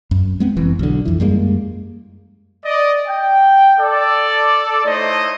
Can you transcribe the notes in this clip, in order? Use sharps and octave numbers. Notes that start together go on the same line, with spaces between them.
F#2
G#3 B3 C4
F1 E3
B1 D3
F2 E3
F#2 G3 G#3 A#3
D5 D#5
G5
A4 D5
A3 D#4 E4 C5 C#5 D#5